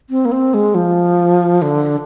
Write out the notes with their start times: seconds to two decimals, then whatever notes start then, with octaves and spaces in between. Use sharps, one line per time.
0.10 C4
0.25 A#3
0.32 C4
0.54 G#3
0.75 F3
1.62 D3